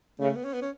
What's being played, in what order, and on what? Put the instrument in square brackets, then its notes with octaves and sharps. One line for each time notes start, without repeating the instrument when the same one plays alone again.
[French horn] C#3 [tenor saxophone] A3
[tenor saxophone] B3
C#4
B3
C#4